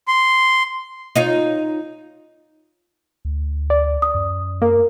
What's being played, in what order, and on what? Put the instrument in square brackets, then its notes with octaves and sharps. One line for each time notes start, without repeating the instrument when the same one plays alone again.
[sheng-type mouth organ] C6
[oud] D#4 F4 C#5
[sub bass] D2
[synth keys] D5
[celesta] D#6
[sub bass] F#2
[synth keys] A#3 [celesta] A#4